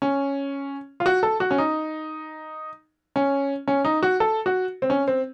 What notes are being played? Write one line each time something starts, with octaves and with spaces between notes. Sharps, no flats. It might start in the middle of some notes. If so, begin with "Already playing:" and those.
C#4
F4
F#4
A4
F#4
C#4
D#4
C#4
C#4
D#4
F#4
A4
F#4
C4
C#4
C4